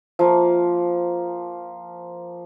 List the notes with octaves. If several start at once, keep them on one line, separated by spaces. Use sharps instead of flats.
F3 A#3